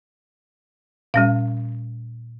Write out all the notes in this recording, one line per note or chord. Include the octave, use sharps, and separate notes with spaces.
A#2 G3 C#4 F5